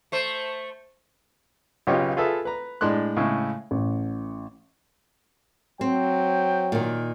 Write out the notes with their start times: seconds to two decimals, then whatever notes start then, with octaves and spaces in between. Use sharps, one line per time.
0.12 A3 C5
1.87 B1 C#3 F4 G4 C#5 D#5
2.17 F4 G#4 A4 B4 E5
2.45 B4 A#5
2.81 A2 G#3 D4 C6 F#6
3.16 A2 C#3 G#3 C#4 E4
3.71 A1
5.81 F#3 C4 G5
6.72 A#2 D#3